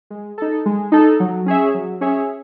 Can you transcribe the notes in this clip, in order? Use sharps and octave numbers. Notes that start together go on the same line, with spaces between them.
G#3
D#4 A4
G#3
D#4 A4
F#3
C#4 G#4 C#5 E5
F#3
C#4 G#4 C#5 E5